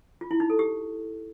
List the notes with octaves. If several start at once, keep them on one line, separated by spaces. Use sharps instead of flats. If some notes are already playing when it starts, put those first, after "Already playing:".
F4
E4
D#4
A4
G4